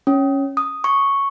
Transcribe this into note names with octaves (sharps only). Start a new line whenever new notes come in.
C#4
D#6
C#6